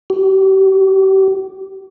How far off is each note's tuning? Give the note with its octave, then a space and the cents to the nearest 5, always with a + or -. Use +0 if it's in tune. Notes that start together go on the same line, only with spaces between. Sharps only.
G4 -35